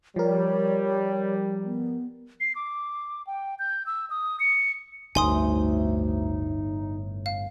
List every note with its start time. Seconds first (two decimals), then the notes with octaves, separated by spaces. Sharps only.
0.16 F3 G3 A#4 C#5
1.65 B3
2.40 C7
2.55 D6
3.27 G5
3.59 G6
3.86 E6
4.10 D#6
4.40 C#7
5.15 G1 D2 A2 D#4 G#5 C6 D#6
7.26 F5